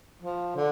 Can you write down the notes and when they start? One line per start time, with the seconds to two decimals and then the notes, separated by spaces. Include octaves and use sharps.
0.22 F3
0.56 D3